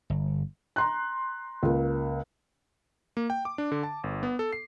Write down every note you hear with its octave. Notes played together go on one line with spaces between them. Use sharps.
G1
A#5 C6 F#6
C#2 A#3
A#3
G5
D6
D4
D3
A5
G1
B3
A4
C7